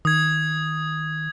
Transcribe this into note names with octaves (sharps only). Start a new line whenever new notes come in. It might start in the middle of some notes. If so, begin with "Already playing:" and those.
D#3 D#6 G#6